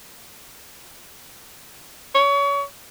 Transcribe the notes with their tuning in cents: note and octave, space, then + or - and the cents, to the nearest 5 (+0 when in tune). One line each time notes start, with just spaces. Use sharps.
C#5 +30